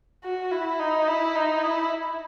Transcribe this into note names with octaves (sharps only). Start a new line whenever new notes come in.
F#4
E4
D#4
E4
D#4
E4